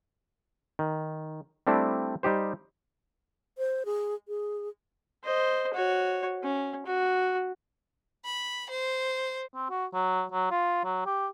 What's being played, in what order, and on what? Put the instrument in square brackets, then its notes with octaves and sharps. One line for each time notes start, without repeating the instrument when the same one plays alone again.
[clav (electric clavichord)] D#3
G3 A3 C4 D4 E4
G3 D#4 G4 C5
[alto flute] C5
G#4
G#4
[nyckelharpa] C5 D#5
F#4 C#5
C#4
F#4
[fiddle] B5
C5
[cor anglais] C4
F#4
F#3
F#3
F4
F#3
G4